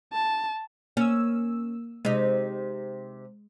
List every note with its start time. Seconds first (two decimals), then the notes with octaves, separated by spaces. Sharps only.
0.13 A5
0.97 A#3 C#4 E6
2.05 C3 G#3 D#4